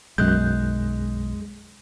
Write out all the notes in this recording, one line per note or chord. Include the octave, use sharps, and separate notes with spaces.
B1 F#2 G#3 F#6 G6